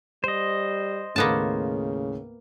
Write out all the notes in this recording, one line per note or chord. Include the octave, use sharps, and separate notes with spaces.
G3 C5 D#5
D#2 A2 C#3 A#3 B3 A5